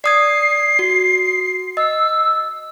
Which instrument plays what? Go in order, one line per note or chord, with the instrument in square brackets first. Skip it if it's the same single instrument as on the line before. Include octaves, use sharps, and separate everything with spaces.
[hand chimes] D5 D#6 G#6 [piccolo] C7
[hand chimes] F#4
[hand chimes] D#5 [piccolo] E6